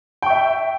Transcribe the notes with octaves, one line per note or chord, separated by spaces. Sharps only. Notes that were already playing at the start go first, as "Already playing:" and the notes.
E5 G5 C#6